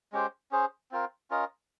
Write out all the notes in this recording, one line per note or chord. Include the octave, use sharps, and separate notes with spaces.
G#3 C#4 G4 C5
C#4 G#4 C5
C4 F4 A#4
C#4 F4 A#4 D#5